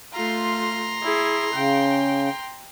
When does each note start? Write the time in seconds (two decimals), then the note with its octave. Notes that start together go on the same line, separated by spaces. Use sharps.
0.13 A3 F4 A#5 C6
1.02 E4 G#4
1.53 C#3 G5